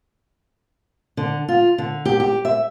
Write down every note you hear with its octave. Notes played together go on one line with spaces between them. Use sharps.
D3
F4
D3
G4
G4
E5